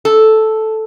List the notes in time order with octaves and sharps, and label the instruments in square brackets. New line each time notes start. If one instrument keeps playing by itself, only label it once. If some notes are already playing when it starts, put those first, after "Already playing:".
[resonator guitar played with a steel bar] A4